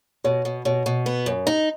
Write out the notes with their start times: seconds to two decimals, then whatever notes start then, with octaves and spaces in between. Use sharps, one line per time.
0.24 B2 C#5
0.45 B2
0.65 B2 C#5
0.86 B2
1.06 B3
1.26 F#2
1.46 D#4 D#5